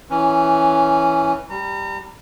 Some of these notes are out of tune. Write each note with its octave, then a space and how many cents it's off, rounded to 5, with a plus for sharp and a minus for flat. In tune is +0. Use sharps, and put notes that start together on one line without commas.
E3 +0 C#4 +0 B4 +0
G3 +0 A#5 -40